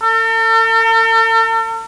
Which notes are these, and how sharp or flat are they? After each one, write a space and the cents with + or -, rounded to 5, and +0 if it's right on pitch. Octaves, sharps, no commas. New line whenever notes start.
A4 +45